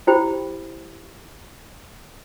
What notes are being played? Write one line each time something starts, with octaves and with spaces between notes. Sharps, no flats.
E4 G4 C5 G5 B5